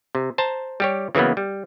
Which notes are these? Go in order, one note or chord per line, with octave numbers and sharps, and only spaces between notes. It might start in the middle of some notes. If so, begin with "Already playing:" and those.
C3
C5 A5 A#5
G3 G4 C#5
C#3 E3 F#3 A#3 B3
G3